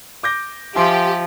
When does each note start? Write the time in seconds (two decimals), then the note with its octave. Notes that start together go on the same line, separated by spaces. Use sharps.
0.23 D6 G6 A#6
0.76 F3 G4 E5 G#5 C6